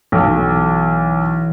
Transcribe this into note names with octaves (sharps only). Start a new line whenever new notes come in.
B1 E3